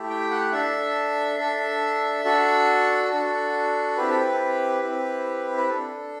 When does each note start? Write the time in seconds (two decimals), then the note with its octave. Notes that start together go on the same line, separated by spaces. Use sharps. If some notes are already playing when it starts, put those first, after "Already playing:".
Already playing: A3 E4 G4
0.10 G5
0.31 F#5
0.52 D4 A4 E5
1.39 D4 A4
2.25 D4 F#4 A4
3.11 D4 F#4 A4
3.97 C4 E4 G4 B4
4.09 A4
4.21 B4
4.83 C4 E4 G4
5.57 B4
5.69 D4 A4